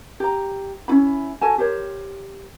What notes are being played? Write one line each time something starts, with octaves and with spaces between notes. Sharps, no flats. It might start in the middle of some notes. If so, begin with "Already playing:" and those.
G4 A#5
C#4 E4 F4 B5
F#4 A4 G#5 A5
G4 A#4 C5 C#5